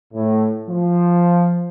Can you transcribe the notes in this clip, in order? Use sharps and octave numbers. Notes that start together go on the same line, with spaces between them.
A2
F3